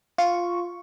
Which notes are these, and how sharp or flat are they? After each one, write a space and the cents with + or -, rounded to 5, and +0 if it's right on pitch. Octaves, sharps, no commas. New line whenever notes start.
F4 +0 C#6 +0